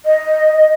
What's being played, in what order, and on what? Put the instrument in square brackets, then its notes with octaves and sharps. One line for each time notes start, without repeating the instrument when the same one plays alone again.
[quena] D#5